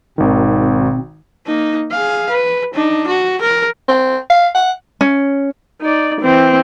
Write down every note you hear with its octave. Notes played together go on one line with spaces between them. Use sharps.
G#1 B2 D#3 C4
A#3 D#4
G#4 F5
B4
D4 D#4
F#4
A#4
C4
F5
F#5
C#4
D#4 D5
E3 C4